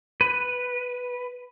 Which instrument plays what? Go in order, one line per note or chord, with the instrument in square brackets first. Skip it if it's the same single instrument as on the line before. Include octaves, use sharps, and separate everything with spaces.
[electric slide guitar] B4